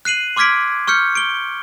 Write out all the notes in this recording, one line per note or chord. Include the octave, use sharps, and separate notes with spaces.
F#6 C7 D#7 F#7
C6 D6 F6 G#6 B6 D7
C#6 F6 G6 C#7
D7 G7